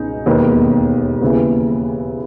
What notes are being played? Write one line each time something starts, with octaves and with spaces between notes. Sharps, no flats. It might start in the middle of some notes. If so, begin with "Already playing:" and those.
Already playing: C#2 B2 C#4 D#4
E1 D#2 D#3 B3
D#2 C#3 E3 B3